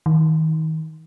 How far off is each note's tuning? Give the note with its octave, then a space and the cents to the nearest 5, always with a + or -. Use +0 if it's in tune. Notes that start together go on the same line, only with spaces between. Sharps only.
D#3 +30